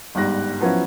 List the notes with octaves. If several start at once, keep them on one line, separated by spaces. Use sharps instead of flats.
G1 G#2 G3 F#6 A#6
F3 F#3 B3 C#4 E4